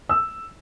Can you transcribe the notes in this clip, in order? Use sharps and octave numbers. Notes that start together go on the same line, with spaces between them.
E6